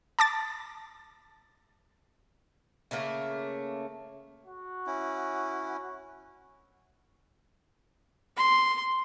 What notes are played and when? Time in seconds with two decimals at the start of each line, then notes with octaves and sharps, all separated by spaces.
0.19 A5 D6 A6
2.91 C#3 A3 A#3 A#4
4.46 F#4
4.87 C#4 E4
8.37 C6